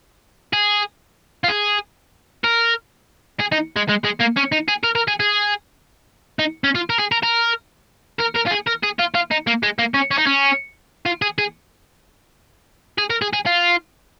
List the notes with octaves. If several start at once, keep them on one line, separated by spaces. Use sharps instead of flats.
G#4
F4
G#4
A#4
G#4
D#4
G#3
G#3
G#3
A#3
C#4
D#4
G#4
A#4
A#4
G#4
G#4
D#4
C#4
F4
A#4
G#4
A#4
A#4
A#4
A#4
F4
G#4
A#4
G#4
F4
F4
D#4
A#3
G#3
A#3
C#4
C#4
D#4
C#4
F4
G#4
G#4
G#4
A#4
G#4
G#4
F4